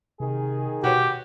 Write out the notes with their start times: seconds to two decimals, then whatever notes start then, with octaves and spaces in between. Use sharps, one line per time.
0.20 C3 D#3 G#4
0.84 B2 F#4 G4 B4 C#5